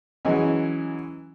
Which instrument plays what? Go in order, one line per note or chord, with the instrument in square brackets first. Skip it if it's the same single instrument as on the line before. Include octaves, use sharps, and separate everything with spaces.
[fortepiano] E3 F#3 G#3 C#4